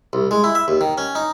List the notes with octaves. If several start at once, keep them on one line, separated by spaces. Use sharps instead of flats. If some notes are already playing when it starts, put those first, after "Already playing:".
C2
G#3
E4
E5
D#2
D#3
C#4
D#4